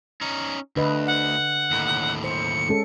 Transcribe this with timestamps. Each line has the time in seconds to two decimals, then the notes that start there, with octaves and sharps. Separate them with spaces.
0.21 C#4 D#4
0.76 D2 D3 B4 D#5
1.07 F#5
1.71 D#2 A2
2.24 C5 C#7
2.69 G#3 C#4 A4